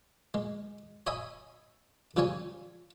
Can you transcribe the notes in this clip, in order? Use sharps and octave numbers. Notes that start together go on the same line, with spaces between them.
G#3
C#5 D#5 E5 G#5 B5
C#3 F3 G3 C#5 G#5 C#6